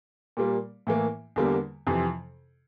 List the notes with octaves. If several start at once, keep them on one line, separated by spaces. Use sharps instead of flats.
A#2 G3 A#3
A2 E3 A#3
E2 D3 G3 A#3
F2 C3 E3